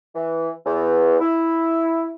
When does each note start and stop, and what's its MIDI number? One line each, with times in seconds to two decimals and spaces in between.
0.16 0.50 52
0.66 1.17 40
1.20 2.15 64